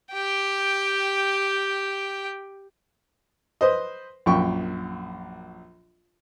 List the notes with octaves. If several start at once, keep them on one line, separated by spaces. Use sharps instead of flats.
G4 G5
B4 C5 D#5
A#1 F#2 G5 C#6